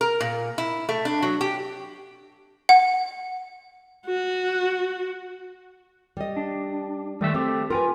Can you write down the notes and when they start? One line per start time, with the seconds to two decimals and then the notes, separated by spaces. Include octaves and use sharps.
0.01 A#4
0.20 A#2
0.58 E4
0.89 A3
1.05 D4
1.22 F#3
1.41 G4
2.69 F#5
4.06 F#4
6.17 G3 D#5
6.36 D4
7.21 D#3 G3 A3 E5
7.34 A3 C4 G4 A4
7.70 F4 A#4 B4 G5 G#5